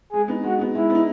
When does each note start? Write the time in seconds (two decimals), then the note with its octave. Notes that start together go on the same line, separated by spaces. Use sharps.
0.12 G#3 G#4
0.28 B3 D#4
0.44 G#3 F#4
0.59 B3 D#4
0.75 G#3 E4
0.90 B3 D#4